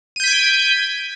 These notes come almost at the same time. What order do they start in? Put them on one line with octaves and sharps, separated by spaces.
D#7 G6 B6 G#6 D7